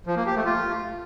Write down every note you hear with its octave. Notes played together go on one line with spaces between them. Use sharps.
F3
A#3
G4
A3
F4